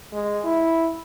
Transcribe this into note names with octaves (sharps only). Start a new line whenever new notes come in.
G#3
E4